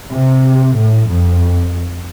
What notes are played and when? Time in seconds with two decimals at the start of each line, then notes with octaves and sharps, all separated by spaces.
0.12 C3
0.75 A2
1.08 F2